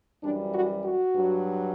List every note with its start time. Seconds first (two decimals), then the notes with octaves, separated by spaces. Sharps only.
0.23 F#2 E3 G3 D4
0.54 F#4
0.85 F#4
1.15 G2 F#3